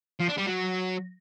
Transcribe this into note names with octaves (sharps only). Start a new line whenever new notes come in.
F3
D4
G3
F#3